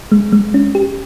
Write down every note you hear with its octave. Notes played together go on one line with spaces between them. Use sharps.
G#3
G#3
C#4
G4